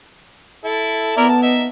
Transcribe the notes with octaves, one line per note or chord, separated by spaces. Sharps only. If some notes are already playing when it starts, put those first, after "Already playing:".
E4 A4
B3 E4 A#4 D5
A5
D#4 E5